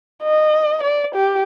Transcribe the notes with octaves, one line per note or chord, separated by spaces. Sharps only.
D#5
D5
G4